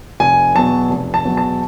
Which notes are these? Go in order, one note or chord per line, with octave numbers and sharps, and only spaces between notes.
F1 G#5
E2 B2 F#3 A5
F1
A5
E2 B2 F#3
A5